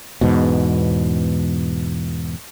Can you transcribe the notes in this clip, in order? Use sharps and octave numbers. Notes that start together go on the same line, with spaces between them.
E2 G#2 B2